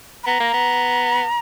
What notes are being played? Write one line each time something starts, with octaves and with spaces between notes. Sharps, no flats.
B5
B3 A#5
A#3
B3